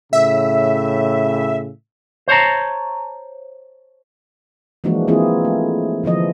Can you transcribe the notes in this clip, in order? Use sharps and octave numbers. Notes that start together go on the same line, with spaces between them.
A2 C#3 E5
C5 C#5 A5 A#5
E3 F3 G#3 A#3 D4 F#4
E3 A#3 C4 E4 F4 G#4
A3
D3 E3 F3 D#5